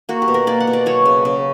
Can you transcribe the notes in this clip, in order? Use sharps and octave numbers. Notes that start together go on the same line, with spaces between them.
A#3 F#4
G4
B2
A#4
A#3 D5
F#5
B2
D5
F#3 C#5
C#3
C#3